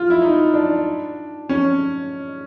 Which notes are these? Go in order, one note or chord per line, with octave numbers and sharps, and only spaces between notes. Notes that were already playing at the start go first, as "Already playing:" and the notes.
Already playing: F4
E4
D#4
D4
C#4